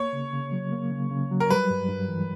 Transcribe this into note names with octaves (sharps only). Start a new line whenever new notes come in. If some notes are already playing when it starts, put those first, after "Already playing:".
Already playing: A#3 C#5
C#3
C#3
F#3
A#3
C#3
C#3
F#3
A#4
G3 B4
G2
G2
E3